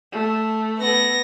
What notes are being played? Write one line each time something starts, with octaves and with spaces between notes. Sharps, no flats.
A3
B3 A#6